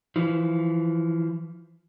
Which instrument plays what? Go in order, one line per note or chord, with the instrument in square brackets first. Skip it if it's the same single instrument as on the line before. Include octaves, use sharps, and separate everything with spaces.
[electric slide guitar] E3 F3